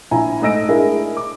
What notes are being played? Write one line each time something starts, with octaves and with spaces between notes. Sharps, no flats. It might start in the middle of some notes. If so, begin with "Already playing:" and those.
A#1 E4 G#5 A#5
G#2 A3 D#5 E6 A#6 D7
D4 E4 G#4 A#4
D6